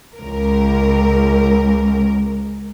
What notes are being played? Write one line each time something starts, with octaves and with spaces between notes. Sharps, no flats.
C#2 A#4